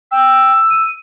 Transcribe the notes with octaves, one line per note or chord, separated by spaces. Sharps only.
G5 E6
D#7